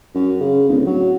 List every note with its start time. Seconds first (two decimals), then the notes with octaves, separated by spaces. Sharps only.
0.15 F#2
0.40 C#3
0.68 D1
0.86 F#3